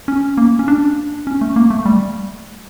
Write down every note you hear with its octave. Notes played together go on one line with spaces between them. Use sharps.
C#4
A#3
C#4
D4
C#4
A3
A#3
A3
G3